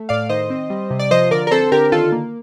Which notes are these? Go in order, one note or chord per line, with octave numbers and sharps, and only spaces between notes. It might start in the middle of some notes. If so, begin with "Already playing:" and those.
Already playing: A3
A2 D5 F5
D#3 C5 D#5
C4
G3
C3
D5
F3 C5 D#5
D3 A#4 D5
A#4
C4 A4 C5
D3 G4 A#4
D#3 F4 A4
A#3